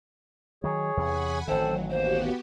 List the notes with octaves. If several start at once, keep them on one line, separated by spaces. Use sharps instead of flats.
D#3 F#3 G#4 C#5
E2 C3 F#5 G#5 B5
A1 D#3 F#3 C4 A4 C5
D#2 A#3 B3 F#4 G4 C5